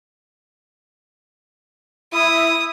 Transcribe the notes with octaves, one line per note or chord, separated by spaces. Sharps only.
E4 D#6